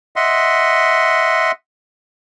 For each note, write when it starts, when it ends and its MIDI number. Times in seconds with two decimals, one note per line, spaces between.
0.16 1.52 75
0.16 1.52 76
0.16 1.52 78
0.16 1.52 84